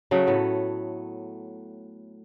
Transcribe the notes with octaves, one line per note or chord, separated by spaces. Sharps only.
C#3 F#3 A3
A2 B3